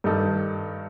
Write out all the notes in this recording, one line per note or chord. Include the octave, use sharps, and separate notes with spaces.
G2 D#3 G3 D#4 A4